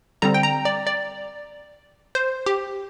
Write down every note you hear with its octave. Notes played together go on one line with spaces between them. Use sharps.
D3 G3 C4 A#5
G5
A#5
D5
D5
C5
G4